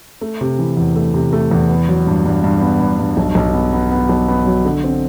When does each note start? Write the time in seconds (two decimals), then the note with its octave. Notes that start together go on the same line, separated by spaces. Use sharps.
0.21 A3
0.41 C3
0.59 E3
0.77 E2
0.96 A3
1.14 C3
1.33 A3
1.51 E2
1.69 B3
1.88 F#3
2.07 G2
2.26 G2
2.44 G2
2.61 B3
2.80 G2
2.99 G2
3.17 B1
3.35 B1
3.54 B3
3.73 B3
3.91 B3
4.09 B1
4.28 B3
4.46 F#3
4.65 D3
4.84 C4